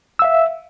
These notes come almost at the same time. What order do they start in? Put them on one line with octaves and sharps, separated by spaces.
E6 F5 E5